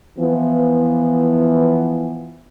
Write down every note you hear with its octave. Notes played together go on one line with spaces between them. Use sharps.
E3 F3 B3